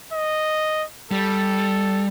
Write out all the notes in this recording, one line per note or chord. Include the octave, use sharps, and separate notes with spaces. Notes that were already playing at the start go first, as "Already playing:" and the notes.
D#5
G3 A4